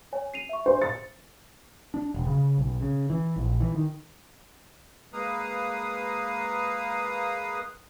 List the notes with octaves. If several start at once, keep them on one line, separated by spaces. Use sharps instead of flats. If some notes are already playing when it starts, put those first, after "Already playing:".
C#5 G#5
C7 D#7 F7
E5 C#6
D4 G4 C5
A6 C#7
D4
E1
C#3
B1
C#3
E3
A#1
E3
D#3
G#3 A#3 B4 F5 A#5 D#6